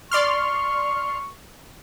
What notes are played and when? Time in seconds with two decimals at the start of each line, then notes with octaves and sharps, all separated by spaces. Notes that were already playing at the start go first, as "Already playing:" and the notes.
0.11 D5 C6 C#6 F6